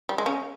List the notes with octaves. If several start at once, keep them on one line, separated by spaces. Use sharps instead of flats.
G3
G#3
C#3 C#4